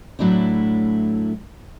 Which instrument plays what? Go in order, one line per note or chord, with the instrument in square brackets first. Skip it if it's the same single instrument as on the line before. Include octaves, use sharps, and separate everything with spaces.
[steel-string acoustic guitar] A2 F#3 A3 D4 E4